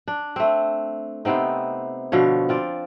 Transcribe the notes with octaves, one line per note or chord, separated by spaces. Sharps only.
D4
A3 C4
C3 B3 C4 D#4
B2 D3 F3 C#5
C4 F4 D5